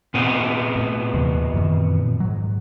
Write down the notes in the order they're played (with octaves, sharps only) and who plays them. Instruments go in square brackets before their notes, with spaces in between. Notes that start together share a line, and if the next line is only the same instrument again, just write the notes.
[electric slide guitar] A#2 B3 C4
[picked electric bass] A2
D#2 C3 E3
F#2 D#3 E3
G#2 F#3